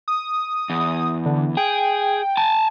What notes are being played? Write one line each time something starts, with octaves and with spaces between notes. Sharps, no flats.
D#6
E2
D3
G#4 G5
G#5 A5